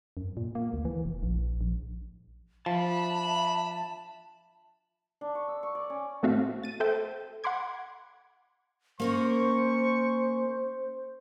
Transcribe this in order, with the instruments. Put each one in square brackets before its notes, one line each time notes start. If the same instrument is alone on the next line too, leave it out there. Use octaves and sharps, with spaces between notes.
[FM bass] F#2
A#2
A#3
D2
E3
F1
A#1
A#1
[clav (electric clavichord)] F3 [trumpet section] D4 B5 [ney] E5 [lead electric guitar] A5
[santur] D4
C#6
E6
C#6
D5
C#4
[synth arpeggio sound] A2 A3 C4 F#4 E5 F5
A6 D#7
A4 C5 E5 G5
F#5 B5 C6 D6 G#6
[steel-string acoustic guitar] A#3 C#4 A#4 [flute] C5 [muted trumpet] C#6